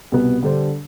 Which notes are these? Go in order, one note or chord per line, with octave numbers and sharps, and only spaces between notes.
C2 B2 B3
D3 G3 D4 A4 C5